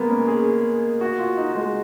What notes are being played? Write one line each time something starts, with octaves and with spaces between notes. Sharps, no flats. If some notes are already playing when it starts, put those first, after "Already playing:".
Already playing: G#3 A#3 B3
C#4
G#4
F#4
F4
D#4
G#3